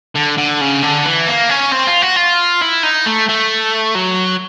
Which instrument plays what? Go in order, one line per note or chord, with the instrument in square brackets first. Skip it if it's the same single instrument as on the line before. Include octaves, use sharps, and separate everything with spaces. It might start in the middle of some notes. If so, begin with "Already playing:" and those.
[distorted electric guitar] D3
D3
C#3
D3
E3
A#3
C#4
C4
F4
F#4
F4
E4
D#4
A3
A3
F#3